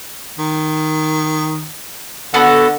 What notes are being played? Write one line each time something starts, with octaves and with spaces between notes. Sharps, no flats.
D#3
D3 B3 F#4 A4